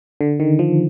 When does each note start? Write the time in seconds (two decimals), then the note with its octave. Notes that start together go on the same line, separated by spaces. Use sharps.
0.21 D3
0.40 D#3
0.59 F3